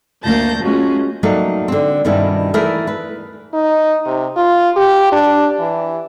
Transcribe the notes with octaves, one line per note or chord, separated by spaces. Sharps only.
D2 A3 A#3 A5 G6 A#6
G#3 A3 C#4 F4 F#4 G#4
F#3 G3 A3 A#3 D#4
D3 C4
G2 B2 D#3 G3 C#4 E4
E3 A3 E4 G#4 A#4
B4
D#4
C3
F4
G4
D4
E3